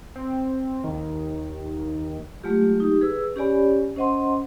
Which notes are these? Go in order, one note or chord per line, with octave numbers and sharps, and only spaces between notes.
C4
D#2 D#3
F#3 G#3 A3 F4 G4
D#4 G4
G#4 B4 E6
C#4 G4 C#5 D5 G#5 B5
C#4 C5 D#5 F#5 C6